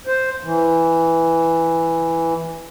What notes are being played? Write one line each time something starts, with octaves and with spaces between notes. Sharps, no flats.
C5
E3